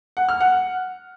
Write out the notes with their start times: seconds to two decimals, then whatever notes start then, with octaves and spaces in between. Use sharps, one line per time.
0.17 F#5
0.29 F6
0.40 F#5